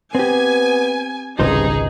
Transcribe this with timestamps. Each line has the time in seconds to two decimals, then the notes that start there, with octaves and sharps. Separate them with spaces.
0.15 B3 C4 G4 G#5
1.39 G#1 C#2 G2 C3 G3 D#4 G#4 C5